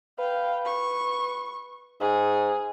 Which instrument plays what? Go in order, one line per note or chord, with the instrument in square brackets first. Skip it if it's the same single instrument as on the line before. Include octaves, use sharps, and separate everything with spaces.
[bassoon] B4 [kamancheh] F5 G5
[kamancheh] C#6
[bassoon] G#2 [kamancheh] G#4